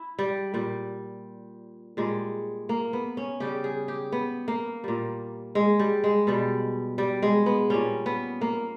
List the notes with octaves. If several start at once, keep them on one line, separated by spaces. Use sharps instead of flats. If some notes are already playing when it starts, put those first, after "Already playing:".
Already playing: E4
G3
A#2 G3
A#2 G3 G#3
A#3
B3
C#4
C#3 G3 G4
G#4
G4
B3
A#3
A#2 G3
G#3
G3
G#3
B2 G3
G3
G#3
B3
A#2 G3 C#4
B3
A#3